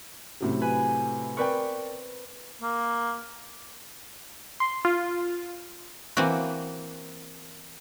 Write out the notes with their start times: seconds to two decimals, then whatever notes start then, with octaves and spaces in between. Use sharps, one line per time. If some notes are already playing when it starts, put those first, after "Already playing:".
0.41 A2 C3 F#3
0.61 B4 G#5
1.37 C4 A#4 B4 D5 G5 C#6
2.62 A#3
4.60 C6
4.85 F4
6.17 E3 A#3 C4 F#4